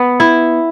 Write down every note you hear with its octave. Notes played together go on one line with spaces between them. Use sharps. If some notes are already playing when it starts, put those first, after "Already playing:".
Already playing: B3
E4